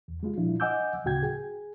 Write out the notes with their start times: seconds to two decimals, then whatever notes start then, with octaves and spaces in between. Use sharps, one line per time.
0.08 E2
0.23 G3 G#3 F4
0.38 A#2 F3 D4 E4 F4
0.60 D#5 F#5 G#5 D6 E6 G6
1.04 D2 A2 C#3 F#4 G5 G#6
1.23 G#4